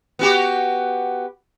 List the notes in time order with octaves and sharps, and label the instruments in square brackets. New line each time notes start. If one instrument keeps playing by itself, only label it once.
[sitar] B3 F#4 G4